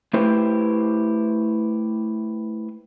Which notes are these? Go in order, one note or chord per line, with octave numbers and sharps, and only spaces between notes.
A3 E4 G4 B4 C5